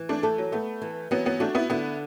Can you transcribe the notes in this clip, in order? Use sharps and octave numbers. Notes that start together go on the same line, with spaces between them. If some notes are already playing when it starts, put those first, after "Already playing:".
Already playing: E3
A3 D4
A3 A4
F#3
A3 B3
E3
E3 F#3 B3
F#3 B3
A3 D4 F#4
B3 E4
D3 B3 E4